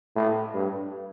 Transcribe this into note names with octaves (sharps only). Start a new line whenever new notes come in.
A2
G2